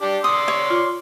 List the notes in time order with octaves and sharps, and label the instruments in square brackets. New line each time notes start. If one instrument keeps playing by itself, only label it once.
[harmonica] D4 G4 D5
[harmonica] D5 C6 E6 [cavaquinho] D#6
[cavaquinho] C#5
[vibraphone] F4